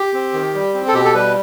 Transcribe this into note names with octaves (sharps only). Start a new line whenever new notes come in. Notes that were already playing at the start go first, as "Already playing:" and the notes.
Already playing: G4
C4
D#3
G3
C4
A4
B2 G4
A4
G3 B4